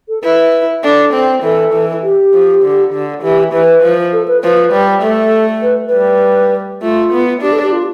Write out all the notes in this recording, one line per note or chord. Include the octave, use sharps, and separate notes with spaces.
A4
E4 B4
D4 A4
C4
E3 A4
E3
G4
F3
D3
D3
E3 G4
E3 B4
F3
A4
B4
F3 B4
G3
A3 A4
B4
B4
G3
A3 F4
B3
D4 G4
A4
G4
F4